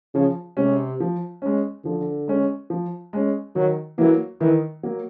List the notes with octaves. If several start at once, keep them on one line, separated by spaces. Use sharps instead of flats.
C#3 F3
C3 G#3 C#4
F3
G#3 C#4
D3 F3
G#3 C#4
F3
G#3 C#4
D#3 F#3
E3 F#3 A#3
D#3 E3
F#3 A#3